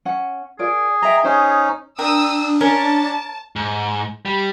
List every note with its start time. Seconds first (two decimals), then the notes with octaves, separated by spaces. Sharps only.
0.05 C#4 F#5
0.59 F4 G#4 A#4 D5
1.02 D#5 E5 G5 A#5
1.24 C#4 D#4 C5
1.98 D4 A#4 G5 D#6 E6
2.61 C#4 A#4 A5
3.56 G#2
4.25 G3